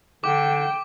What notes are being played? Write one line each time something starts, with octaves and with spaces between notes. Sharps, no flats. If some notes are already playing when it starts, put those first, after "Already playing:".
D3 G5 D6